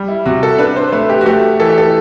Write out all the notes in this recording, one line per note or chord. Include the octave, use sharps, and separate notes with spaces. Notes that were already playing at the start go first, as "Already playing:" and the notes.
Already playing: G3
E4
C3 F#4
A4
D4 B4
C5
C5
A3 B4
G4
F#4
A3 G4
E3 A4
G4
A4